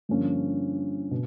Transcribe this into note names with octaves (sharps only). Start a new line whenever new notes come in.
G2 D3 F3 A#3 C#4
B2